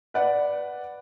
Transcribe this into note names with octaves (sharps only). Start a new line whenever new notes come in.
B4 D5 F#5